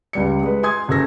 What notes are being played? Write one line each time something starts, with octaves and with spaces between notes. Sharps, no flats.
C#2 G3 C#7
G#3 B4
G#5 C6 D#6 G#6
F#1 G#4 A4 E6 A#6